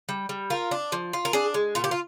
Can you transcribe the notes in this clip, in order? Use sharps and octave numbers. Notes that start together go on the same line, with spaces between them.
G3
G3
F4 A#4
D4
F3
F4
A#4
D4 G#4
G#3
A#2 F4
G4
F4